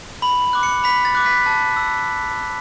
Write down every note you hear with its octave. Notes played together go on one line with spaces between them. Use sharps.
B5 F#7
D6 F#6
C#7
B5 B6
A6
D6 F#6
B6
A5
E6